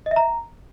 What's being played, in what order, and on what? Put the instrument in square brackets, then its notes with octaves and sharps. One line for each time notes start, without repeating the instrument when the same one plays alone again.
[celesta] D#5
E5
A#5